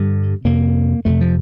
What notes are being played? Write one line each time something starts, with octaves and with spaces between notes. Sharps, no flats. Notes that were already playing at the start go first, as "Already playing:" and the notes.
Already playing: G2 D3 G3
F2 C3 A#3
F2 C3 A3
F3